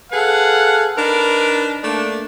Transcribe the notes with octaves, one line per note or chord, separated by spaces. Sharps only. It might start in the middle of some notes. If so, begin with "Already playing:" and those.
G#4 A4 B4 F5 F#5
D4 D#4 A#4 B4
A3 A#3 D4